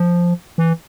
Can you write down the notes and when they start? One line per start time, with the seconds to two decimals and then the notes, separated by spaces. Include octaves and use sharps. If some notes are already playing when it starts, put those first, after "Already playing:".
Already playing: F3
0.58 E3